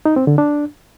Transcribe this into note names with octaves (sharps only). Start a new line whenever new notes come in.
D#4
C4
D3
D4